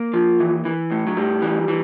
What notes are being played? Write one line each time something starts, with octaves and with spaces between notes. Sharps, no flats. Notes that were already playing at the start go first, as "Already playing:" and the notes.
Already playing: A#3
F3
E3
E3
A2
F#3
A2 G3
E3
E3